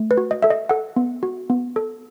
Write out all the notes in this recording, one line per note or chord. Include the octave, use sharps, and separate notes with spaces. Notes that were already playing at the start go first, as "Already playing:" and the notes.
Already playing: A3
B4
F#4
D#5
A4 E5
D#5
A4 F#5
B3
F#4
B3
A4